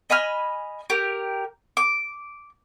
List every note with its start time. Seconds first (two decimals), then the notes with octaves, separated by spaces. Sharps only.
0.10 D#5 G#5 B5 F6
0.90 G4 A#4
1.77 D6